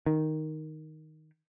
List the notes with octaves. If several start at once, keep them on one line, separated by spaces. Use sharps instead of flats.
D#3